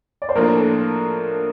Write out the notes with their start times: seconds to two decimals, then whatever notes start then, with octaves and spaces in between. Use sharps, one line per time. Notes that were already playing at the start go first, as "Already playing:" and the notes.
0.22 D5
0.29 C5
0.35 A2 F3 A#3 D4 F4 A#4
0.57 A4